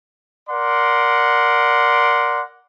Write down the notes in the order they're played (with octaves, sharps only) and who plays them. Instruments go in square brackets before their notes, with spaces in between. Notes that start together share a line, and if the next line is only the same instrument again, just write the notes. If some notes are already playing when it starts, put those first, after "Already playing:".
[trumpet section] A#4 D5 F#5 C6